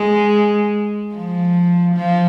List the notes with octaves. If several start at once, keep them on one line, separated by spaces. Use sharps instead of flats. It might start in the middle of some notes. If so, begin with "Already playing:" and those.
Already playing: G#3
F3
F3